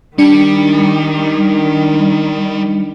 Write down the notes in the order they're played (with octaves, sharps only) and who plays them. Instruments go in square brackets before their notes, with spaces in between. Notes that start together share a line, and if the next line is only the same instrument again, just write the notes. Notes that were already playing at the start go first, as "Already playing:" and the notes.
[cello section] D#3 [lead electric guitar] G3 [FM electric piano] D4 C#7